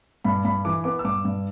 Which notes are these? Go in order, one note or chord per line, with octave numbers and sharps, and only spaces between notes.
G2 B5
G2 B5
E3 D6
B3 D6
E6
G2 D6
G2